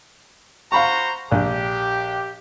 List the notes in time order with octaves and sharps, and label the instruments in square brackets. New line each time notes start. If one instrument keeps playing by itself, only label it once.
[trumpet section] F#4 C5 A#5 [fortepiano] F5 B5 C#6
[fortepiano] A#1 [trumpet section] G4